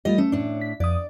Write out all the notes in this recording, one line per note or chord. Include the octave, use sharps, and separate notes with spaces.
G3 A3 F4 G4 D#5
A3 C#4
A2 D4
B6
F2 D5 D#6